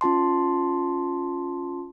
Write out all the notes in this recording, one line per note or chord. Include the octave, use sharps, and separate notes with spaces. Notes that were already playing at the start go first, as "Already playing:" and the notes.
C#4 F4 A5 C6